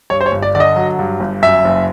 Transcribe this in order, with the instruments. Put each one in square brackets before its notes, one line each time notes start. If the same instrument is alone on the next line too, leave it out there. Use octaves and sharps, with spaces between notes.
[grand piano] G2 C#5
C5
C#5
G1
D5
D3 D5
D#5
F#3
G2
G1
F#2 E5
F#1